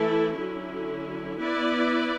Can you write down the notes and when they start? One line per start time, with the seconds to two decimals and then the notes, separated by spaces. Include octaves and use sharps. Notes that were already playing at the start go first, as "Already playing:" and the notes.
Already playing: E3 A3 E4 A4
0.36 D3 F#3 C#4 E4
1.38 B3 E4 B4 D5